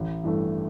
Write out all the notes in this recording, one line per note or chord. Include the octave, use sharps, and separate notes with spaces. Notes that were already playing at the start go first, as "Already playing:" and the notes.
Already playing: A1
G2 E3 A3